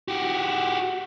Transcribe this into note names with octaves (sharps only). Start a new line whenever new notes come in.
F#4 G4